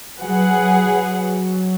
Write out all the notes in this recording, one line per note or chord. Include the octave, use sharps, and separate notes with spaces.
F#3 G#4 B4 F#5
F#3
F#3